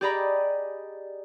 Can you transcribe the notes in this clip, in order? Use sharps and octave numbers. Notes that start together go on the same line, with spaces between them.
G4 G#4 D5 D#5 A#5 B5